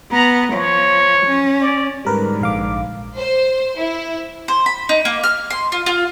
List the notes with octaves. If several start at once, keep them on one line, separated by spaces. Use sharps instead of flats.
B3 A#5
F3 C#5
C#4
D5
G#2 D3 G3 A#4 B4
A#1 F5 D6
C5
E4
C5
B5
D#4
A#3
F6
C6
F4
F4